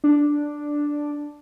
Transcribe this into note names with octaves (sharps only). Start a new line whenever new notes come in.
D4